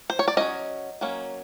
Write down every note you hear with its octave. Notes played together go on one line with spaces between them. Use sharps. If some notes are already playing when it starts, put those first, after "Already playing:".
C5
C#5
D5
F#3 A#3 C#4 D#5
F#3 A#3 C#4